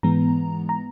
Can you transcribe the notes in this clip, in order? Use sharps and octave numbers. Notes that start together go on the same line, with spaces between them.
G#2 E3 G#3 B3 A#5
A#5